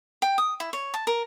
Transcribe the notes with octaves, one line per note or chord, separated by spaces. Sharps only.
G5
D#6
E4
C#5
A5
A#4